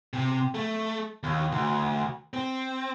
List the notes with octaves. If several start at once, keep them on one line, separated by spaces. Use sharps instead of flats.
C3
A3
D#2
D2
C4